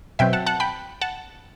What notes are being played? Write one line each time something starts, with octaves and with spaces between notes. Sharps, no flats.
B2 F#3 C4 E5 G5
F#5 A5
F#5 A5
G5 B5
F#5 A5